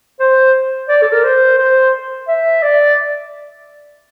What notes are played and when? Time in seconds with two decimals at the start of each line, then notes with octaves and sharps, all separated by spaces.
0.20 C5
0.89 D5
1.02 A4
1.12 A#4
1.24 C5
1.58 C5
2.28 E5
2.62 D5